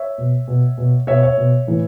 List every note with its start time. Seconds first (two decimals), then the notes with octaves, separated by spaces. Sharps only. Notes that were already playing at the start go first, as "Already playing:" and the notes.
Already playing: C#5 E5
0.18 B2
0.48 B2
0.78 B2
1.07 B2 C#5 E5
1.23 C#5 E5
1.37 B2
1.67 A2 E3